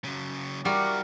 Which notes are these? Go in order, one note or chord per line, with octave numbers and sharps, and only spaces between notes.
C#3 F#3
G3 E4 F#4 A#4 F#5 C#6 D6